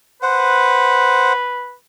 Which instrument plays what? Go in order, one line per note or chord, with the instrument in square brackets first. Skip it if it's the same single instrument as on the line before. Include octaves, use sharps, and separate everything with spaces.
[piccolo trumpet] B4 [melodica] C5 F#5